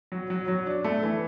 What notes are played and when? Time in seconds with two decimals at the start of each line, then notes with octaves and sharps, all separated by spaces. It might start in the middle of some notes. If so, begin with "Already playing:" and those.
0.12 F#3
0.30 F#3
0.48 F#3
0.66 D4
0.84 A3
1.03 E3